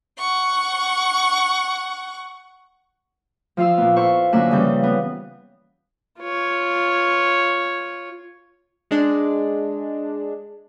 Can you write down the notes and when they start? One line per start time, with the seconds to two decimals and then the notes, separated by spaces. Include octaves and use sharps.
0.17 F#5 C#6
3.57 F3 F4 F5 E6
3.78 A#2 B3
3.96 E4 A4 C5 F5 C#6
4.32 F#2 D3 A#3 E5 G#5 F#6
4.51 C#3 E3 F3 G3 C#4 G6
4.83 B3
6.20 F4 C#5
8.91 G#3 D4